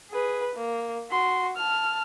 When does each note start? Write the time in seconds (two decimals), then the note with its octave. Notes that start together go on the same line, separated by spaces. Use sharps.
0.11 G#4 B4
0.56 A#3
1.10 F#4 C6
1.57 A5 F6